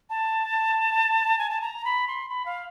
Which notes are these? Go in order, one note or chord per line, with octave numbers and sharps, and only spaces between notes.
A5
G#5
A5
A#5
B5
C6
B5
F5